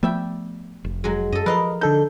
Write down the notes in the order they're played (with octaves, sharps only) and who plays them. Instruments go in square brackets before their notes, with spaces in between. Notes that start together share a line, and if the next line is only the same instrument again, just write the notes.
[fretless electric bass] F3 A3 B3 [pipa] G3 E5 G5
[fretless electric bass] F1
[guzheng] F#3 G#3
[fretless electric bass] F#2 [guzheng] A4 D#5
[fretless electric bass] F3 [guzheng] A#4 F5 [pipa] B4 D#5
[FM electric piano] D3 A4 G6 [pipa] D#4